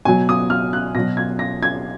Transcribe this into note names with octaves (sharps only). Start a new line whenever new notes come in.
B2 F#3 G#5
D#6
F6
F#6
B2 F#3 A#6
G#6
A#6
G#6